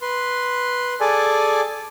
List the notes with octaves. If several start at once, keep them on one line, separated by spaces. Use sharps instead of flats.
B4 C6
G#4 A4 D5 G#5